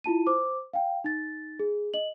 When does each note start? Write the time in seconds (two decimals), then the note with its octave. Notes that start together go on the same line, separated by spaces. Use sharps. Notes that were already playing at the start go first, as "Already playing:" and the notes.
0.04 E4 F4 A5 D#7
0.27 C5 D6
0.73 F5 G5
1.04 D#4 A6
1.59 G#4
1.94 D#5 F#7